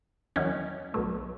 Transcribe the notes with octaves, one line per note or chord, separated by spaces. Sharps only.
E2 D#3 F#3 C#4
B1 B2 A3